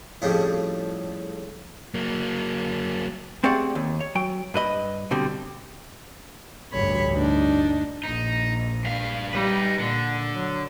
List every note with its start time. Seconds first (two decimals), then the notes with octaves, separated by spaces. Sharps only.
0.22 F2 A2 C#3 G3
1.94 F#3 A#3
3.44 A3 C4 G4 G#4 D5 F#5
3.75 D#2
4.00 C#5
4.15 F#3 G5
4.54 G2 B4 D#5 B5
5.11 B2 D3 G3 C4
6.72 A1 D2 G2 C#5 B5
7.12 D4 D#4
8.03 A#1 D#4
8.85 G2 F5
9.33 G3 D#4 B4
9.80 A#2 D3
10.34 F#3